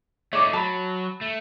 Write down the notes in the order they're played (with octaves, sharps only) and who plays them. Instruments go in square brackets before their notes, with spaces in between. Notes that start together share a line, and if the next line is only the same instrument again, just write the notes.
[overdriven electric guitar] A3 D#4 [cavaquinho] C#5 D5 D6
[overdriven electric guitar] F#3 [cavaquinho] A5 B5
[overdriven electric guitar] A3